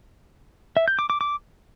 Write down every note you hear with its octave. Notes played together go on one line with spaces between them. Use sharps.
E5
G6
D6
D6
D6